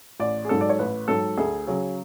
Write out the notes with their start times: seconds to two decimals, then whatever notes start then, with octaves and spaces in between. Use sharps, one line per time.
0.20 A1 D5
0.45 G#4
0.49 G#2 F#3 A4
0.61 D5
0.69 C#5
0.79 A1 B4
1.08 G#2 F#3 A4
1.37 D2 G#4
1.67 C#3 F#3 G#4